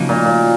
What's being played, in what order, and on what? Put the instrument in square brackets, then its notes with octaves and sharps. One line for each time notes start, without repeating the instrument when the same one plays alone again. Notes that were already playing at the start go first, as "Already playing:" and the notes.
Already playing: [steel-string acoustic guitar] C#3 F3 A#3 D#4 F#4
[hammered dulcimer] A#2
A#2